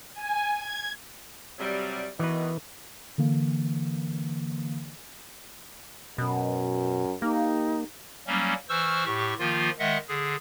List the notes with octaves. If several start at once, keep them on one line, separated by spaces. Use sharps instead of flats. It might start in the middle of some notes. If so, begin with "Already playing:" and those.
G#5
G#6
C3 F#3 G3
B2 D#3 E3 B4
D3 E3 A#3
F#2 B2
A#3 D#4 G4
F#3 G3 A#3 C#4
E3 C5 C#6 E6 F6
A2 G4 C#6
D#3 F3 A#3 F4
D#3 G#3 D#5 E5 F#5
D3 G#4